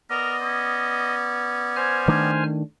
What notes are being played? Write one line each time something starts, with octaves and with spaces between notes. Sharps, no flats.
B3 A#4 D5 D#5
C#4
C5 G#5 F6
D#3 A3 D4